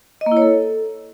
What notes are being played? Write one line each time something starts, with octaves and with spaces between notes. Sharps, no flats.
D#5
A#3
E4
C#5
A4